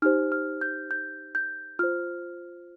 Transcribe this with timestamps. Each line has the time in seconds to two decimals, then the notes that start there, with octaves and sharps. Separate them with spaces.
0.02 D#4 G4 C5 F6
0.32 F6
0.61 G6
0.91 G6
1.35 G6
1.79 F4 C5 F6